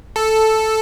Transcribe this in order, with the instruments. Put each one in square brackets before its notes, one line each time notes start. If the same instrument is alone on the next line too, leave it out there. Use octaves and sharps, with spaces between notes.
[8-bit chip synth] A4